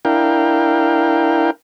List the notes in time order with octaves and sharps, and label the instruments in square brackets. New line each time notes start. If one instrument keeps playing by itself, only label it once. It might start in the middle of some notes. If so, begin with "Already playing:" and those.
[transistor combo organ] D4 E4 A#4 F5 G5